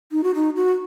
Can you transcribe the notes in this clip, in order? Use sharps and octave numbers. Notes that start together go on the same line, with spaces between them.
D#4
F#4
D#4
F#4